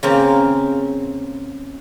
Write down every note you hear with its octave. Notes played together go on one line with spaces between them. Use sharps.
C#3 A#3 C4